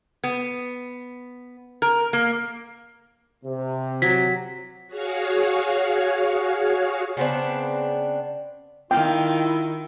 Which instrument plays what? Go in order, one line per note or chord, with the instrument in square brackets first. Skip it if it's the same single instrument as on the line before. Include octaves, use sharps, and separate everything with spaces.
[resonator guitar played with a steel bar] B3
A#4
A#3
[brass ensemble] C3
[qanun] F#3 [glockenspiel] B6
[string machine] F#4 G#4 C#5 F5
[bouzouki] C#3 B3 C4 D4
[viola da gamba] D#3 [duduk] E4 [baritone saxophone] F4 [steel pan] G5